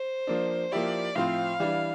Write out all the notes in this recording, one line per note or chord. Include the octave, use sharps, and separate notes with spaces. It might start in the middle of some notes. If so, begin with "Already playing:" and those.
Already playing: C5
F3 A#3 D4
F3 A#3 E4 G4 D5
A2 F3 C4 F4 F5
E3 G3 D4